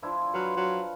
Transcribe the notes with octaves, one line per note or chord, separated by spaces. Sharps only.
F3 D4 E4
F#3 B4 F5 B5
F#3